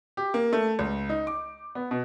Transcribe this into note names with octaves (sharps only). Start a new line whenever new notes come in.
G4
A#3
A3
C#2
D#4
D6
B3
B2